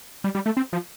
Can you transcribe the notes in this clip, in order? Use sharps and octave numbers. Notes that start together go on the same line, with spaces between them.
G3
G3
A3
C4
F3